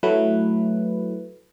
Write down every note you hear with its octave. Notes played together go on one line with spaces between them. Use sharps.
F#3 A3 E4 B4